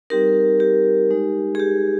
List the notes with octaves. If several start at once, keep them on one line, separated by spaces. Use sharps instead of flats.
G3 C4 D#4 G4 A#4
G4
G#3 D#4
G#4
G4